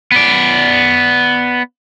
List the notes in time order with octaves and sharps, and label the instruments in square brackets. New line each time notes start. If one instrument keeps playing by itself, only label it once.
[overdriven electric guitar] B3 D5